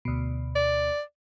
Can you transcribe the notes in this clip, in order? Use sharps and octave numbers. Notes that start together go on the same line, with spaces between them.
D2 B2
D5